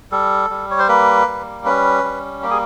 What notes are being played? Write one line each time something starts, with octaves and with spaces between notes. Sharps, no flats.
G3 A4
G3
C#5
C5
A#3 B4
G3
C#4 B4
G3
A#3 G4
G#4